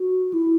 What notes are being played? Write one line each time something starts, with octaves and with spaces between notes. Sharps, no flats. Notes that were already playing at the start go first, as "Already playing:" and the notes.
Already playing: F#4
E4